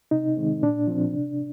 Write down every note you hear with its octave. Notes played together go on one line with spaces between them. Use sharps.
C3 D#4
D#3 G#3 C4
A#2 D4
F3 C4
C3